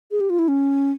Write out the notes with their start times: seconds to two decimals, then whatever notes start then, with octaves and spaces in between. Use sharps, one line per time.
0.11 G#4
0.20 G4
0.30 F4
0.39 E4
0.48 C#4